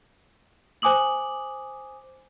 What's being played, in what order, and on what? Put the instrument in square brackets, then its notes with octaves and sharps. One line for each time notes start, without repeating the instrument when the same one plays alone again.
[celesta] C5 G#5 D6 D#6 F#7